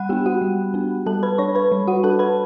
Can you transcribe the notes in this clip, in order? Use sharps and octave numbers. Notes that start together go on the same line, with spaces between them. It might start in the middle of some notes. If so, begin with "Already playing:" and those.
Already playing: G3 F#5 B5 F#6
B3 D4 G4 G5
F#4 F#5
G3
B3 D4
G3 A4 A5
B4 B5
D4 C#5 C#6
B4 B5
G3
F#4 F#5
D4 A4 A5
B4 B5